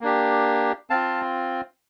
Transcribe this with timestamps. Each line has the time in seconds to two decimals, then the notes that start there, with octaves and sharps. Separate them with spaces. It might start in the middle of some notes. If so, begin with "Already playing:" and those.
0.01 A#3 D4 G4
0.90 C4 F4 F5 A5